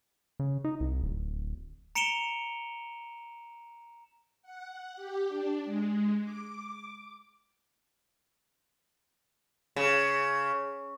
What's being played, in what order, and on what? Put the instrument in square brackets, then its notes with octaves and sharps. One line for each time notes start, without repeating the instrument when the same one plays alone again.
[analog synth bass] C#3
D#4
C2
D1
[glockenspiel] A#5 C#7 D7 E7 F7 G7
[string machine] F#5
G4
D4
G#3
D6
[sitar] C#3